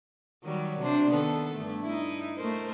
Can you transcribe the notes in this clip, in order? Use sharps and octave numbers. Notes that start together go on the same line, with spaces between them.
D#3 F#3 G3
C3 D4 C5
D#3 B3 A4
G2 A3
D#4 E4
A3 A#4 C5